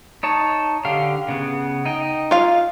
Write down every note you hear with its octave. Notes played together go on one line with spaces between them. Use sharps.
D#4 C#5 A5
D3 G4 F5
C#3 B3
D#4 D#5 G5
F4 F5